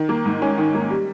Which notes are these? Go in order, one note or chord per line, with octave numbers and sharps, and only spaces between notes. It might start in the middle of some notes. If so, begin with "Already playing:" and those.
Already playing: D#3
A#3
G#2
C#4
D#3
A#3
G3